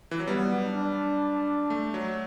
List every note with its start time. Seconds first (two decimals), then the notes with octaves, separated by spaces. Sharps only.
0.11 E3
0.20 F#3
0.27 G3 B3
0.64 D4
1.70 A3
1.94 F#3